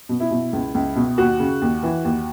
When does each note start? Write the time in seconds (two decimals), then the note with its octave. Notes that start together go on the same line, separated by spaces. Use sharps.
0.09 B2
0.20 E4
0.31 B2
0.53 C#2
0.74 C#2
0.96 B2
1.18 D#2 F#4
1.40 C#3
1.61 D#2
1.83 E3
2.04 D#2